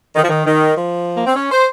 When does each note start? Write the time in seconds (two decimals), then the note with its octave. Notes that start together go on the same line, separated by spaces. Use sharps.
0.15 D#3
0.22 F3
0.29 D#3
0.45 D#3
0.75 F3
1.15 A#3
1.26 C4
1.35 C#4
1.51 C5